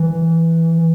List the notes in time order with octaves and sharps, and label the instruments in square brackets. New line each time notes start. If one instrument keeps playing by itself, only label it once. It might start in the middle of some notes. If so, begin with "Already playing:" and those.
Already playing: [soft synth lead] E3